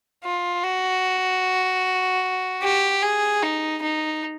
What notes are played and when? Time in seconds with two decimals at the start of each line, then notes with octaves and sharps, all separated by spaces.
0.24 F4
0.63 F#4
2.62 G4
3.03 G#4
3.43 D#4
3.82 D#4